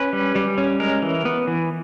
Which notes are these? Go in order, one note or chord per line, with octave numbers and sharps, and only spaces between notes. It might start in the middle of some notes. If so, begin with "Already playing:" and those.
Already playing: C#4 B4
G3
G3
C#4
G#3 A#4
E3
B3
E3